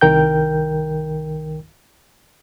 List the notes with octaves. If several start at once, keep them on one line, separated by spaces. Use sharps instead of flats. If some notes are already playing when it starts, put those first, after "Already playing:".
C2 D#3 A#4 G5 G6